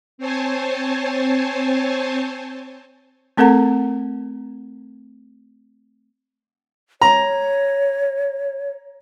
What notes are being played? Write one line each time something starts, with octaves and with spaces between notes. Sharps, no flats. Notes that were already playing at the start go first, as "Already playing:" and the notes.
C4 C5 C#5 G#5 A5
A3 C4 A4 A#4 F#5 A#5
C#5 A#5